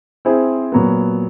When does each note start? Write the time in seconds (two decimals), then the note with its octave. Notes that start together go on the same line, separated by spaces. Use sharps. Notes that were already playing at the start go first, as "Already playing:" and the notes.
0.25 C4 E4 G#4 C5
0.72 A#2 F#3 B3